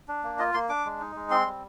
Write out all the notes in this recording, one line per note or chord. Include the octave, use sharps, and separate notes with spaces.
D4
A#3
F4 D#5
A#3 C6
D4 D6
G#3
D#4
G#3
C4 C6
G3